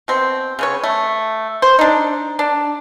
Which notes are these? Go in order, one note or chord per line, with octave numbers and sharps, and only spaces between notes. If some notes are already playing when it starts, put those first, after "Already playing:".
B2 C4
C#3 B3 C#5
A3
C5
D4 D#4
D4